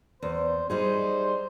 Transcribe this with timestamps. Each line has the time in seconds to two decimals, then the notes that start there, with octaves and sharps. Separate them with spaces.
0.22 E2 C5
0.70 G3 D#4 G#4 C5